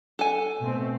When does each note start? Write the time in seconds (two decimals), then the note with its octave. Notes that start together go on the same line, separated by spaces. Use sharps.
0.19 A4 G#5
0.60 B2 A3 C4